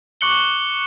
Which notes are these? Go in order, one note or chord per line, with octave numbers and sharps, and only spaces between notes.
C#6 D6 F#6 C#7 F#7 G7